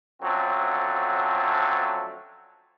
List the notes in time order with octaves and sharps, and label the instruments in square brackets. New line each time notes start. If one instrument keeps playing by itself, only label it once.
[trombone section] D3 F3 F#3 A3 C4 C#4